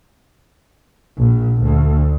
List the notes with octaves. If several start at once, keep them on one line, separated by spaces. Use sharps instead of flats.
A#1
D2